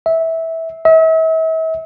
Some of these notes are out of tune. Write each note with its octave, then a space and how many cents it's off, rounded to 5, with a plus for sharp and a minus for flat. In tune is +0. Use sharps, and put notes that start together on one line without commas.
E5 -15
E5 -40